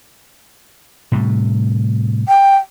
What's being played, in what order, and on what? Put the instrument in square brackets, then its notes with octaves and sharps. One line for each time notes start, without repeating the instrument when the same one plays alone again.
[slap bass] A2 C3 G3
[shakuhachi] G5